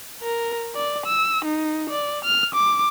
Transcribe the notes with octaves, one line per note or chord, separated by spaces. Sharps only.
A#4
D5
E6
D#4
D5
F6
D6